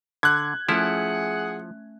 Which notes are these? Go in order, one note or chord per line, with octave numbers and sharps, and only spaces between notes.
D3 F#6 G#6
F3 A3 C#4 E4 G#4 F#5